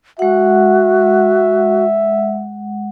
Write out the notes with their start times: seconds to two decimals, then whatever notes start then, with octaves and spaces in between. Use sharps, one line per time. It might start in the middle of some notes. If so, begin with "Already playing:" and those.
0.19 G#3 F#4 E5 F#5